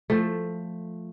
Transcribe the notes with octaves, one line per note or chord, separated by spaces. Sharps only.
F3 A3